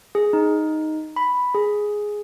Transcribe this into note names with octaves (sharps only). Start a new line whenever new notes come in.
G#4
D#4
B5
G#4